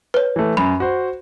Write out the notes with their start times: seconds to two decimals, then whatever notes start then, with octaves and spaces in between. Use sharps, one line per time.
0.14 B4 C#5
0.36 E3 A3
0.57 F#2 B5
0.80 F#4 C5